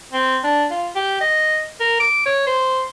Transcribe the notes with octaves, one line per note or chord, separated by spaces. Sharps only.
C4
D4
F4
G4
D#5
A#4
D6
C#5
C5